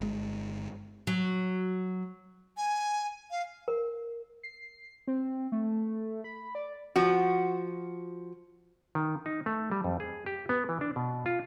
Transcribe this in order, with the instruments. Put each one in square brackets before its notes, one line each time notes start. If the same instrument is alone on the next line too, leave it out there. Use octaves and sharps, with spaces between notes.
[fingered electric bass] G1 G#3
[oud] F#3
[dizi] G#5
F5
[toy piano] A#4
[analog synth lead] C7
C4
A3
B5
D5
[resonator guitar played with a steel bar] F3 F#4
[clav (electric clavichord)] D#3
D#4
A3
G3
F2
G#4
G4
B3
E3
D4
B2
F4